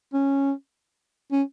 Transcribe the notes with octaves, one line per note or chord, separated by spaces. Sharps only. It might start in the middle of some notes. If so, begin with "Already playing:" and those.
C#4
C#4